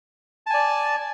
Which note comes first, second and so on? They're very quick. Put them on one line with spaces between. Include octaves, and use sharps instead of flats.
A5 G#5 D5